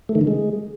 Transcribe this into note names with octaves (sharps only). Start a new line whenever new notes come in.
A3
D#3
D3
G#3